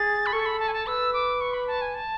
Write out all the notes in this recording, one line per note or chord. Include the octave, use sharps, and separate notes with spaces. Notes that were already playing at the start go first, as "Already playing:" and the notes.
Already playing: G#4 A6
B5
A4 C#6
B5
A5
G#5
A5
B4 E6
D6
C#6
B5
A5
G#5
A5